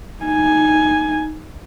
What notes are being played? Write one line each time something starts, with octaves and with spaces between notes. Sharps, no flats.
D#4 G#5